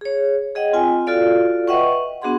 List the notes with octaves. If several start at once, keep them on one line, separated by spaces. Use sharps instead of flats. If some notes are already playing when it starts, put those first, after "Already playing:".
G#4 C#5
G#4 D#5 F#5 G5
C4 F4 G5 G#5
F4 F#4 A4 D5 F5
B4 D#5 E5 F#5 G5 C#6
B3 D4 F#4 G#4 F#5 C6